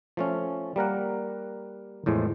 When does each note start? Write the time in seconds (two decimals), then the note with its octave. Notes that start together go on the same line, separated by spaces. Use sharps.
0.17 F3 A3 C#4
0.76 G3 A#3 A#4 F#5
2.06 E2 A2 F3 G#3